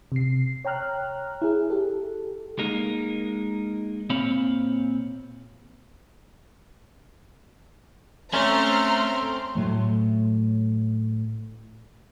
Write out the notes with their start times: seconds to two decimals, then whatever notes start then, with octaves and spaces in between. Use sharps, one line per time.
0.12 C3 C7
0.65 C#5 G5 A#5 F6 F#6
1.42 E4 G#4
1.70 G4 A4
2.59 G#3 A#3 D#4 A#4
4.10 A#2 C4 C#5 F5 B5
8.33 A3 C4 C#4 A#5 C6 F6
9.55 A2 F#3 A3